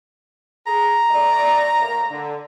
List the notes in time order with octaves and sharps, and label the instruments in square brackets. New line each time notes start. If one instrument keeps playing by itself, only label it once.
[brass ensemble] G#4 [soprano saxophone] A#5
[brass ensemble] A2 A3 D5
A2 A#3
D3